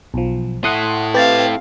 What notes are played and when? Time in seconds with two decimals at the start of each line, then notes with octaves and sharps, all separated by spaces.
0.14 B1 F3
0.64 E4 A4 F#5 C6 D#6
1.14 C4 G4 B4 F5 A6